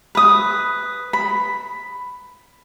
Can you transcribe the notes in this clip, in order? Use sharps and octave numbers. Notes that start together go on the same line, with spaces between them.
B4 D#6
B5